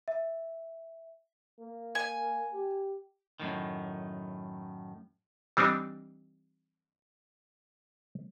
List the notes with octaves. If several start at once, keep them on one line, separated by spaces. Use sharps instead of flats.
E5
A#3
G#5
G4
F#2 A2 D#3
E3 G3 C4 D4 D#4